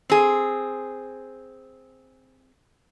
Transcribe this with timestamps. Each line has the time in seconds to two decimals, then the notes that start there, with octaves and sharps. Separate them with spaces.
0.10 C4 G#4